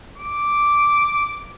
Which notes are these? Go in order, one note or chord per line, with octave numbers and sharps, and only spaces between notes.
D6